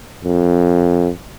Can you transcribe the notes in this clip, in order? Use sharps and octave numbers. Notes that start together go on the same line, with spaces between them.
F2